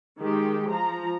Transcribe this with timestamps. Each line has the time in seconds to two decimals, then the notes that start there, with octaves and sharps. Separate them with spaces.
0.18 D#3 G#3 G4
0.69 F3 A#5